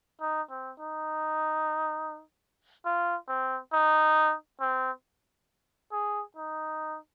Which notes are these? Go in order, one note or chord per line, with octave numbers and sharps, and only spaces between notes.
D#4
C4
D#4
F4
C4
D#4
C4
G#4
D#4